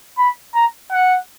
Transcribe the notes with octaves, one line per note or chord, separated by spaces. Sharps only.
B5
A#5
F#5